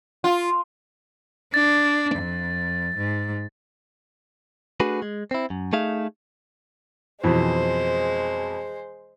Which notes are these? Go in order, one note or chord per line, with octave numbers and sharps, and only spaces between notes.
F4
D4 A6
F2
G#2
A3 D4 F#4 G#4 B4
G#3
C4 E4
F#2
A3 D#4 G#4 E5 F5
F2 B2 E3 G#3 C5